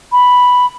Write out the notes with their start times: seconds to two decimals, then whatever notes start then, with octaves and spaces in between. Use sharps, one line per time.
0.12 B5